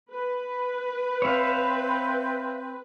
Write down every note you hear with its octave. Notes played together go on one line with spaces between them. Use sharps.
B4
C4 C#5 E5 F5